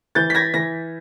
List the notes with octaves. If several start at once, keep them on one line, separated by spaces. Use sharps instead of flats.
E3 G6 A6
B6
G#6 A#6
E3 A#6